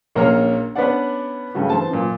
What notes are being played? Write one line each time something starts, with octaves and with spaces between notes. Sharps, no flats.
A#1 A#3 C#4 A#5 F6
B3 C#4 D4 D5 F#5
G2 C#3 A3 F#4
E3 C4 A5
F#2 A#2